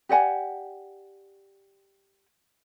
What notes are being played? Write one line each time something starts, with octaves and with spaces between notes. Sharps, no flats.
G4 D5 F#5 G#5